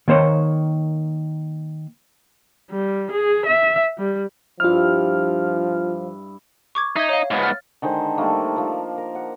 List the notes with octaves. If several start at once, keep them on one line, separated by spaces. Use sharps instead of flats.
D#3 A#3 C5 C#5
G3
G#4
E5
G3
G2 F3 E4 F4 F6
C#6 D6 G#6
D#4 E5 G#6
C#5 F5
G#2 B3
F6 A6
D3 D#3 G#3 C5
D#3 G3 A3 A#3
F3 A#3
A#4
F#5